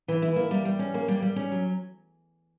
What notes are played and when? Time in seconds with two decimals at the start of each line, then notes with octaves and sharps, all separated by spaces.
0.08 E3
0.22 E4
0.36 A#3
0.51 G3
0.65 G3
0.79 C#4
0.94 A#3
1.08 G3
1.22 G3
1.36 C#4
1.51 F#3